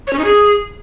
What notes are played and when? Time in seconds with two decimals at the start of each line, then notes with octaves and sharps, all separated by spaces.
0.07 C#5
0.13 C#4
0.19 D#4
0.24 G#4